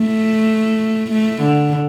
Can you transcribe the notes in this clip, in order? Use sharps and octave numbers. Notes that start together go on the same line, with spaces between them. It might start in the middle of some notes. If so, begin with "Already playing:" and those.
Already playing: A3
A3
D3